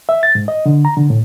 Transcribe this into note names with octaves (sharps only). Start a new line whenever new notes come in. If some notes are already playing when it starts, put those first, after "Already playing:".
E5
A6
G#2
D#5
D3
A#5
D3
A2